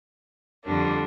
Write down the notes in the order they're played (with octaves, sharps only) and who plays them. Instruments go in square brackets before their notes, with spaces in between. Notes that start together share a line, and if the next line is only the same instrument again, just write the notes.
[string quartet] F2 D3 G3 A#3 D4